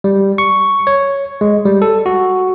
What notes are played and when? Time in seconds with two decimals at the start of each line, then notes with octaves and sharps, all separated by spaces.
0.04 G3
0.38 C#6
0.87 C#5
1.41 G#3
1.65 G3
1.82 A4
2.06 F#4